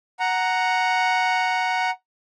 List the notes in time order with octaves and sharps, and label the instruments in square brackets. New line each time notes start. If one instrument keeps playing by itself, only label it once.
[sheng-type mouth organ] F#5 A#5